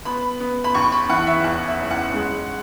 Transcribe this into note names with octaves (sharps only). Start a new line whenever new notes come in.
B3 B5
B3
B5
D#2 C#6
B5
E3 F#5
E5
E2 F#5
E5
F#1
F#5
G#3